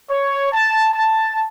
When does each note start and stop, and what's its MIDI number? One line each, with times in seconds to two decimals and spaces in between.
0.10 0.51 73
0.53 0.91 81
0.94 1.47 81